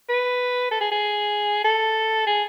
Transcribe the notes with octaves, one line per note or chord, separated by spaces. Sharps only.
B4
A4
G#4
G#4
A4
G#4